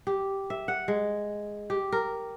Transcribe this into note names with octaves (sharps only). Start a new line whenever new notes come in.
G4
E5
F#5
G#3
G4
A#4